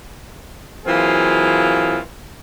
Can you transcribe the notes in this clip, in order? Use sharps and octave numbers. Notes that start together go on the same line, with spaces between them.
E3 F#3 A#3 C4 F4 G#4